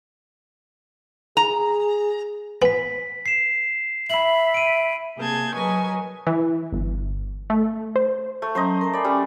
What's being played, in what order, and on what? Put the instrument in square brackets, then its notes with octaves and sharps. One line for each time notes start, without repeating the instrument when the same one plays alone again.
[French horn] G#4 [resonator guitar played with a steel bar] A#5
[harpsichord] B3 [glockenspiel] G#5 B6
[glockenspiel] C7 E7
[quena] E5 [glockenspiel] B5 F#7
[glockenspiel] D7 D#7
[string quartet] C3 A#3 G#4 A5 G6 G#6
F#3 A#4 B4 D#5 G#5 C#6
[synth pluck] E3
G1
A3
C5
[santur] A3
[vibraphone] F#3 C#4 A#5 [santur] C5 D#5
[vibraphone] A#4 A5
[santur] D5 [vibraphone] G#5 B5
[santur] G3 [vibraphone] C#4